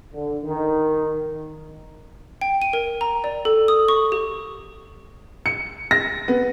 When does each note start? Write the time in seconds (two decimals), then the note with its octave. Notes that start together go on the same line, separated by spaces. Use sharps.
0.13 D3
0.44 D#3
2.41 G5
2.62 D#7
2.73 A#4
3.01 A#5
3.24 D5
3.45 A4
3.68 D#6
3.88 C#6
4.12 G4
5.46 C#7
5.91 A#6
6.28 B3